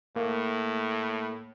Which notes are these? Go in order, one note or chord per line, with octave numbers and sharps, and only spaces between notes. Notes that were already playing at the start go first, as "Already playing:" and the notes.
A2 A#3